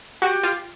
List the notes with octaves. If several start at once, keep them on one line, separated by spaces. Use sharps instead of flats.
F#4 G4
F4